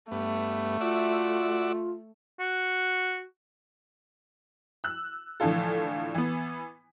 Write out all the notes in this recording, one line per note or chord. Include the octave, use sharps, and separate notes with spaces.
G2 A3 B3
F4 F#4 D5 E5
F#4
E6 F#6
A2 D3 E3 F3 F4 A4
E3 B3